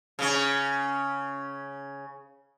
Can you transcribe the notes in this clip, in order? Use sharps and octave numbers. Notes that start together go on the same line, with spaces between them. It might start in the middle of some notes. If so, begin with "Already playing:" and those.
C#3 C#4